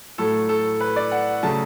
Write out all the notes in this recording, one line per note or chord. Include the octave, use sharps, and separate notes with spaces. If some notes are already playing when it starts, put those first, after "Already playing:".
A2 F#3 A3 A4
A4
B4
D5
F#5
C#3 F#3 A3 A5